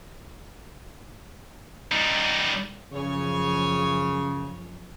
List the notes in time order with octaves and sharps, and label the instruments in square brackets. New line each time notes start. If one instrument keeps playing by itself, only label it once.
[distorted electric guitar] G3 D#4
[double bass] F#2 F3 [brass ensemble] C#3 [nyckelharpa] C#5 G#5